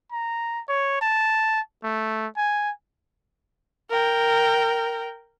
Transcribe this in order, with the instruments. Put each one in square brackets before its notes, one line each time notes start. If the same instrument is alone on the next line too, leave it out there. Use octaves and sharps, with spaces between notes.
[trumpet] A#5
C#5
A5
A3
G#5
[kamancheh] A#4 G5